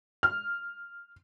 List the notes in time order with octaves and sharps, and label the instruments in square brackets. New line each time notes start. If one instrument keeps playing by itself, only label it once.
[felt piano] F6